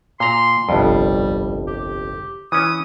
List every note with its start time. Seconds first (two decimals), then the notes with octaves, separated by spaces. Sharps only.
0.20 A#2 A#5 C6
0.69 G1 C2 F2 G3
1.67 G4
2.52 E3 C#4 D#6